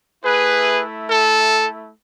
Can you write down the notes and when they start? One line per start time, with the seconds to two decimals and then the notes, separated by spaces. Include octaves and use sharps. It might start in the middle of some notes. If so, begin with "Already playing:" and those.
0.24 A3 E4 G#4 B4
1.08 A4